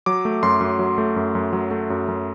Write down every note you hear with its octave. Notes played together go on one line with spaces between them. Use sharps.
F#3 D6
A3
F#2 C6
F#2
F#3
A3
F#2
F#2
F#3
A3
F#2
F#2